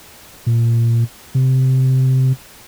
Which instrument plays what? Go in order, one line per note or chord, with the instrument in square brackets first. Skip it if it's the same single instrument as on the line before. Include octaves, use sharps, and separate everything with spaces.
[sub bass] A#2
C3